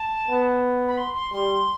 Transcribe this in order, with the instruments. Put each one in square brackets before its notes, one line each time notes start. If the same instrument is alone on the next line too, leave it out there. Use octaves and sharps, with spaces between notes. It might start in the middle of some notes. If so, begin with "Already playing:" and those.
Already playing: [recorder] A5
[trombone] B3
[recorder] B5
C6
C6
[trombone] G3 [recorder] C6